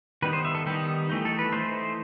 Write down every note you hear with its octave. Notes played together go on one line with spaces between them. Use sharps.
D#3 G3 B3 D#4 B4
C5
E5
A4
D#3 G3 B3 D#4 G4
E3 A3 D#4
A4
B4
E3 A3 D#4 C5